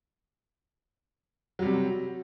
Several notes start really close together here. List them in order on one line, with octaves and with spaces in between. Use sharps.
F#3 G3 C3